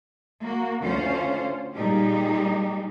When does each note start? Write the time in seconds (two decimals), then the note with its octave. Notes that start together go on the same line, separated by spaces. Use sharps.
0.42 A#3 F#4
0.82 D2 C#4 F4 C5 F5
1.74 A#2 G3 D#4 G4 G#4